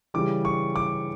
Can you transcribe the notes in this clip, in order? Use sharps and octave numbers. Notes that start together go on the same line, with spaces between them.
C#3 E3 G3 D6
C#6
D6